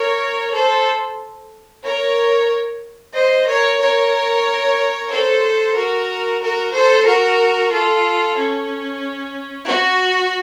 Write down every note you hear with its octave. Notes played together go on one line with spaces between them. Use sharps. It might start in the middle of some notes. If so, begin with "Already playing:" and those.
Already playing: A#4 C#5
A4 C5
A#4 C#5
C5 D#5
A#4 C#5
A#4 C#5
A4 C5
F#4 A#4
F#4 A#4
A4 C5
F#4 A#4
F4 A4
C#4
F#4